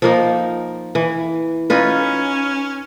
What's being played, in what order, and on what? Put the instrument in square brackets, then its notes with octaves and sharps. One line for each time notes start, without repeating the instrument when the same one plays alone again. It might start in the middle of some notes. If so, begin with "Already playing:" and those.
[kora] F3 A#3 D#4
E3
[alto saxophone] C#4 [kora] D#4 F4 B4